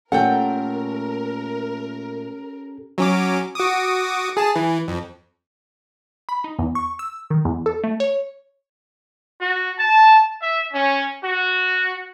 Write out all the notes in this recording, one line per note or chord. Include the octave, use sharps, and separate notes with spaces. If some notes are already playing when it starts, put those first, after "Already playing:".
A#2 A3 C#4 G4 A4 A#4 F#5 G5
F#3 C#4 D6
F#4 D6 D#6
G#4 A5
E3
F2
B5
D#4
E2
C#6
E6
D#3
E2
A4
A3
C#5
F#4
A5
E5
C#4
F#4